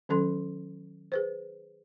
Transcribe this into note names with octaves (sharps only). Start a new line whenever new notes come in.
D#3 F#3 C#4 A4 C6
G#4 B4 C5